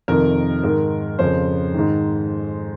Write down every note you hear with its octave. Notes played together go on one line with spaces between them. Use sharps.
F2 C3 D#3 A#4
G#2 D#3 A#4
F2 C#3 C5
G#2 D#3